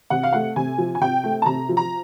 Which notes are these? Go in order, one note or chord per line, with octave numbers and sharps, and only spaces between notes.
C3 F#5
F5
A3 F#5
C3 G#5
F3
G#5
C3 G5
A3
A5
C3 A#5
F3
A#5